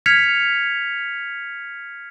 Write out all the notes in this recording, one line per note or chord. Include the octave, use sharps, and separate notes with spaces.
F6 G#6 B6 C#7 F7